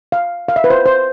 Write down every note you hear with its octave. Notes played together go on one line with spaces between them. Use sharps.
F5
F5
E5
B4
C5
C5